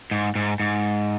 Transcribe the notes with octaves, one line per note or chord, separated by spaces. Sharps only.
G#2
G#2
G#2